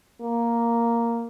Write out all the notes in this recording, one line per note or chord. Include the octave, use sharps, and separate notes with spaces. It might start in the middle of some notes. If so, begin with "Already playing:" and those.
A#3